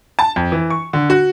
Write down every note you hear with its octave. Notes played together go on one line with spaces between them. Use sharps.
A5
F2
E3
C#6
D3
F#4